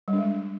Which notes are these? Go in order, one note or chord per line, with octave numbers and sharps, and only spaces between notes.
G3
D4
G#3